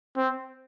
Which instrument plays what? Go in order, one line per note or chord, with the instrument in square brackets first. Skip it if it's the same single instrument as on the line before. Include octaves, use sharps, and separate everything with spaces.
[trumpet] C4